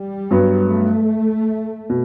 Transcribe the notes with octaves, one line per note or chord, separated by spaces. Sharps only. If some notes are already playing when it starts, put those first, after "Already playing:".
Already playing: G3
G2 F#3 B3
A3
B2